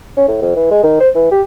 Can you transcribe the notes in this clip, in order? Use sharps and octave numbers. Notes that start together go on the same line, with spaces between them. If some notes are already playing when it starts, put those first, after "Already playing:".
C#4
A2
F2
E3
G#3
D#3
C5
E3
G4